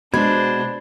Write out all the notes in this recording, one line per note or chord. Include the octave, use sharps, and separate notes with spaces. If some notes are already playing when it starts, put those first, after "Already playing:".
B2 G#3 D4 C5 B5 G#6